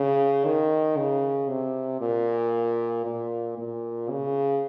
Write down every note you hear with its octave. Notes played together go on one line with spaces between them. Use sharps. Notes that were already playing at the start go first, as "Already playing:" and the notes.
Already playing: C#3
D#3
C#3
C3
A#2
A#2
A#2
C#3